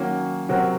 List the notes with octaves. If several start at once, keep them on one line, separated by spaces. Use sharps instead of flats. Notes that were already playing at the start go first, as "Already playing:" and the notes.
Already playing: D#3 F#3 A#3 C#4
C3 F#3 C4 F#4 A#4